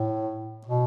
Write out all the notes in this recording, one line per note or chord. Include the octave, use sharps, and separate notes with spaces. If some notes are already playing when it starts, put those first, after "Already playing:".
Already playing: A2
B2